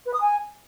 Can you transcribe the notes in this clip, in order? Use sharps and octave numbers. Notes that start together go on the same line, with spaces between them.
B4
D#6
G#5